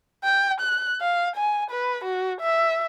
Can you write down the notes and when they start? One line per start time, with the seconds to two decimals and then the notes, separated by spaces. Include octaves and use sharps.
0.24 G5
0.61 F#6
1.01 F5
1.36 G#5
1.70 B4
2.04 F#4
2.41 E5